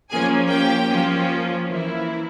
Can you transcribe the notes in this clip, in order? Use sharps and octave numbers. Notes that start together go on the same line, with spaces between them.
F3 A#3 C#4 G#4 G#5
G4 G5
F3 A#3 C#4 F4
E3 A#3 E4